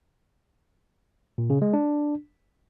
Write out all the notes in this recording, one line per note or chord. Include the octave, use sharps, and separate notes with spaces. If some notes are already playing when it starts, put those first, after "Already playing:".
A#2
C#3
G#3
D4